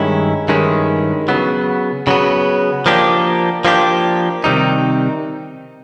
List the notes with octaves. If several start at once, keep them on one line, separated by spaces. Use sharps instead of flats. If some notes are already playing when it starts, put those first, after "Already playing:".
Already playing: G2 D#3 G#3 C#4 E4
G2 D#3 G#3 C#4 E4
C#3 F#3 B3
C#3 F#3 B3
F3 A#3 D4 G4
F3 A#3 D4 G4
C3 D#3 G3 C4 D#4